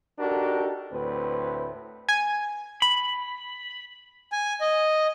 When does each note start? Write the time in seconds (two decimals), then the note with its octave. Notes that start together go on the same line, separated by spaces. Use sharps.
0.19 D4 D#4 F#4 G4 A4 A#4
0.92 D2 A2 C4 B4
2.09 G#5
2.82 B5
4.32 G#5
4.61 D#5